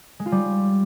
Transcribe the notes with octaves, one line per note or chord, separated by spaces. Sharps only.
G#3
F4
G3